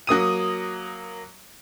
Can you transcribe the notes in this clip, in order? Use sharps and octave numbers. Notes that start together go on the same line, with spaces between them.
F#3 A#3 D#6 D#7